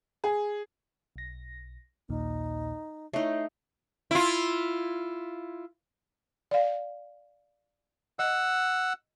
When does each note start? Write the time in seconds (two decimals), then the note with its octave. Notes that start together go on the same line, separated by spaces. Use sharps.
0.24 G#4
1.16 B1 A#6
2.09 A#1 D#2 A#2 D#4
3.13 A3 D#4 E4 C#5 C7
4.11 E4 F4
6.51 D5 F5
8.19 D#5 F#5 E6